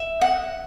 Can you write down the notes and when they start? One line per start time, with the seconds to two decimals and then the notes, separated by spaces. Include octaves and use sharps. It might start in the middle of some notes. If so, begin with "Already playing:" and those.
Already playing: E5
0.21 F#5